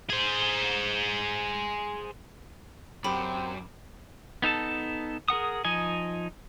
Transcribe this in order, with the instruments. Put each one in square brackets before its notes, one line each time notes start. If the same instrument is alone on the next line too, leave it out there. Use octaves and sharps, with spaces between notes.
[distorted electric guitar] G#4 C5
[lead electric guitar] F#2 [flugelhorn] C4 [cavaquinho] G4 [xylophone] B5
[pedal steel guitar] B3 D#4 A4 A5
G#4 A#4 F#5 D#6
F3 D#4 D#5 G#5